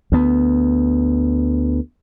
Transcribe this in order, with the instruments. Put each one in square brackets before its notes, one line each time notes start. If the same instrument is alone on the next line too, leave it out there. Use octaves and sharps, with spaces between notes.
[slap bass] D2 B3